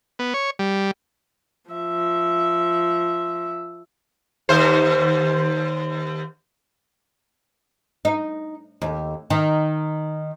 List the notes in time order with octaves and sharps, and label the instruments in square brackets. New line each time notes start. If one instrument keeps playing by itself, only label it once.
[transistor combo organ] B3
C#5
G3
[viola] F3 E5
[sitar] D#2 C5
[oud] D#4
D#2
D#3